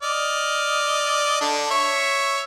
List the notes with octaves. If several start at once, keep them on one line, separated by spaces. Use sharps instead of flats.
D5 D#5 F6
D3 D4
C#5 E5